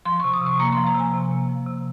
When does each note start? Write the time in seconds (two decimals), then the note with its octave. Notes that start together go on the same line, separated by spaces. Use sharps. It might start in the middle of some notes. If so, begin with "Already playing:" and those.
0.05 F3 C6
0.20 C3 C#6
0.33 D#6
0.42 C3 C#6
0.59 A#3 A#5
0.73 F3 C6
0.87 A#5
0.95 C3 G#5
1.14 C3
1.31 A#3
1.49 F3
1.66 C3